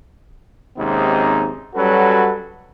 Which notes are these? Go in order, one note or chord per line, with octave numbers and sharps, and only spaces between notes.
D#2 G#2 C3 C4 C#4 D#4
F#3 G3 C#4 F#4 A4 B4